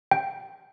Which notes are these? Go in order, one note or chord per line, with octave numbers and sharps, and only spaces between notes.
G5